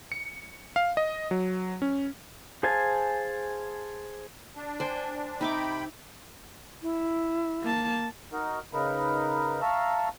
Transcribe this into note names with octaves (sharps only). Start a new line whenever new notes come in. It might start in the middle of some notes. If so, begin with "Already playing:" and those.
C#7
F5
D#5
F#3
C#4
G#4 C5 F5 G#5 A5
D4
C5 G5 G#5
C3 D#4 E5 G5 B5 D6
E4
A#3 A5
D#4 F#4 A#4
C#3 D#4 A#4 B4
E5 F5 A5 A#5 C#6 E6